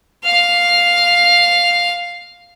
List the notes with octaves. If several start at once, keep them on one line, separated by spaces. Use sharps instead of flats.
F5 F6